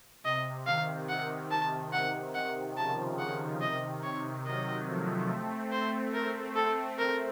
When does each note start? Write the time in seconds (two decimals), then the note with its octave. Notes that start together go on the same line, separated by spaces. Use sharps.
0.24 C3 D#5
0.67 C3 D#3 F5
1.09 F#5
1.51 A5
1.93 F#5
2.35 F#5
2.77 C#3 F3 A5
3.19 F#5
3.61 C3 D#3 D#5
4.03 C#5
4.46 D#3 F#3 D#5
4.87 F3 A3
5.30 A3 C4
5.58 A3 C4
5.72 C5
5.86 A3 C4
6.14 A3 C4 A#4
6.56 A4
6.99 A#4